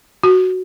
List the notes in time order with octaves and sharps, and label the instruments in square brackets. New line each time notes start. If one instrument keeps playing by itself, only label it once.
[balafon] F#4